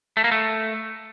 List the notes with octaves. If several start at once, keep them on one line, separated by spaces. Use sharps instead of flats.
A3
A#3
A3